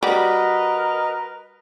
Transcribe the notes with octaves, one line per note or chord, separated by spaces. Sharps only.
G3 F#4 A#4 B4 D#5